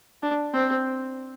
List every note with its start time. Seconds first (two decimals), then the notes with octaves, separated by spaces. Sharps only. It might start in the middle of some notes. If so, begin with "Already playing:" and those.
0.22 D4
0.53 C4